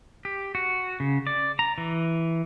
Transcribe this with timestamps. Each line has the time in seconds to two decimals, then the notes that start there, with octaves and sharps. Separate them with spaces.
0.25 G4
0.55 F#4
1.00 C#3
1.27 D5
1.59 A#5
1.78 E3